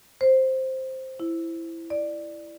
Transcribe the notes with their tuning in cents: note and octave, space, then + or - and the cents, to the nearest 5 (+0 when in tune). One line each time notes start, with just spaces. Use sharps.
C5 +5
E4 +10
D5 +15